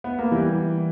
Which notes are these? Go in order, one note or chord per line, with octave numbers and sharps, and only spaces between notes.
B3
A#3
E3 G3